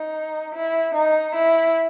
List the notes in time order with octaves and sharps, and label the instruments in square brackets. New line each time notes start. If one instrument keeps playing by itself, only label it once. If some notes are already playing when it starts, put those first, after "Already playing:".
Already playing: [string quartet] D#4
E4
D#4
E4